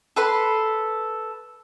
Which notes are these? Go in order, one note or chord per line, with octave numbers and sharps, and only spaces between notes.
A4 B4 C6